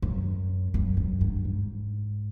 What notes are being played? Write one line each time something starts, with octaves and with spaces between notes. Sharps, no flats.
F#2
F#2
F#2
G2
G#2